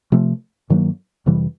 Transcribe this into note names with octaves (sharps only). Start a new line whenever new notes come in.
C3 F3 A3
G2 D#3 F#3 A#3
F2 C3 E3 G3